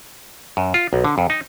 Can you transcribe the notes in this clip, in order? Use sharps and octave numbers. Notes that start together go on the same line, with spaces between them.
F#2
F4
B1
D3
F2
D#4